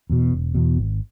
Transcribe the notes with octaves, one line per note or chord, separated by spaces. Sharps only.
E2 B2
E1
E2 B2
G#1